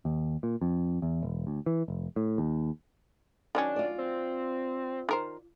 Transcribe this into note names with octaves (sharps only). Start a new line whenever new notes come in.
D#2
A#2
F2
E2
E1
D2
E3
F1
A2
D#2
D#3 F#3 C#4 D4
F4 D5
C4
D#3 A#4 C5